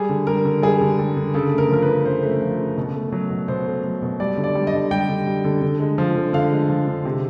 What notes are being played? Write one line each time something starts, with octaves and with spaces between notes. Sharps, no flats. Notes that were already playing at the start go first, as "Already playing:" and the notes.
Already playing: G3 G#4
D3
G3 A#4
D3
G3 G#4
D3
G3
D3
C#3 A4
A3
A#4
F3 A#4
B4
C#3
C#3 C5
A3
F3
C#3
B2
A3
F#3
B2
B2 C5
A3
F#3
B2
G3 D5
D3
D5
G3
D#5
D3
G3 G5
D3
G3
D3
D3
G#3
F3
D3
D3 F5
G#3
F3
D3
C3